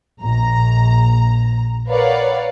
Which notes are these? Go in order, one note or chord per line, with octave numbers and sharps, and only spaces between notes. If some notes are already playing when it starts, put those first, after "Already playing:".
A#1 A#5
A#4 B4 C#5 D5 F5 F#5